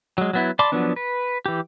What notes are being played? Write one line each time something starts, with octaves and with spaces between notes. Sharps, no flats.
F#3 G#3
F#3 B3 E4
D5 A5 B5 C6 D6
F3 F#3 B3 D4
B4
E3 G4